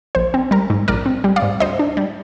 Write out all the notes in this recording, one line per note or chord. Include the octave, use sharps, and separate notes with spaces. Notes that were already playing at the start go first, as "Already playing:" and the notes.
A#1 C5
C4
G3 A#4
G#2
A#1 A#4 D5
C4
G3
D5 F5
G#2
D2 C5 D#5
D4
G3